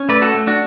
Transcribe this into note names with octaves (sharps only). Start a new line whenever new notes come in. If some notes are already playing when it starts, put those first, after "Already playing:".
Already playing: C#4
A3 B4 D5
F#4 A4
A3
D4 F#4